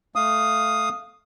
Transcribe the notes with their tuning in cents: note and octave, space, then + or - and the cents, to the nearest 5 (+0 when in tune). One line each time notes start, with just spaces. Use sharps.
A3 -10 F5 +0 D#6 +0